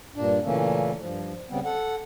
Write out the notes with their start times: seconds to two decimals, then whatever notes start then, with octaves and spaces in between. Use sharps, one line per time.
0.16 G2 A#2 D4
0.43 A#2 C#3 E3 A3 A#3 C#4
0.99 G2 F3
1.50 C#3 G3 B3 C4
1.65 A4 F#5